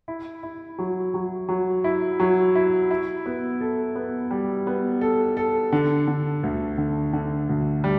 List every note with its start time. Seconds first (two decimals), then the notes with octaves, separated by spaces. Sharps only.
0.08 E4
0.43 E4
0.79 F#3
1.14 F#3
1.49 F#3
1.84 E4
2.20 F#3
2.55 E4
2.91 E4
3.26 B3
3.61 A4
3.95 B3
4.31 G3
4.67 B3
5.01 A4
5.37 A4
5.72 D3
6.07 D3
6.43 D2
6.78 D3
7.13 D3
7.49 D2
7.84 G3